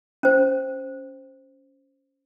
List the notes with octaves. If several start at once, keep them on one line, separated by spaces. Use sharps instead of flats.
C#4 C5